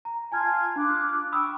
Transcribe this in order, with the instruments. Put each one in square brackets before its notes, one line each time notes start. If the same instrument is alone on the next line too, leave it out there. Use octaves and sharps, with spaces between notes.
[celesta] A#5
[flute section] F4 G#6 [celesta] G#5 A5 F6
[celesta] D4 [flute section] F4 D6 F#6
[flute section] G5 C#6 [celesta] B5 D#6 E6